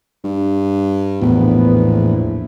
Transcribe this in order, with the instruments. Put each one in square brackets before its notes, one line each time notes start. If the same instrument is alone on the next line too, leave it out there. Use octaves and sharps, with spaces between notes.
[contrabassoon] G2
[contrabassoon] A#1 [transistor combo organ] E2 A2 [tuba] B3